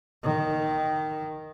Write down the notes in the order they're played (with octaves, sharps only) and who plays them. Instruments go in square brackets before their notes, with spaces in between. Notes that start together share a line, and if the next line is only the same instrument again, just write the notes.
[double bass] D#3